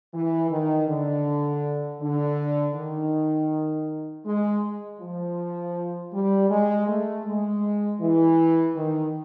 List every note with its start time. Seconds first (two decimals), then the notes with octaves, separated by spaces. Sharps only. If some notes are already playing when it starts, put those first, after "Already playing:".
0.13 E3
0.50 D#3
0.88 D3
2.00 D3
2.75 D#3
4.25 G#3
5.00 F3
6.12 G3
6.50 G#3
6.88 A3
7.25 G#3
8.00 E3
8.75 D#3